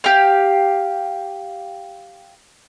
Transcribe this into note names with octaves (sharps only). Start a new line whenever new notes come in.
G4 F5